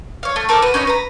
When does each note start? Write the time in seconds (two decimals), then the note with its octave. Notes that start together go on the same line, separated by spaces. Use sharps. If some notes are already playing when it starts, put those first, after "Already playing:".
0.23 C#5 F5
0.36 A3
0.49 A4 A#4 C5 D6
0.62 F#4 B4
0.74 C#4 D#4 A#4 C#5
0.87 B4 A#5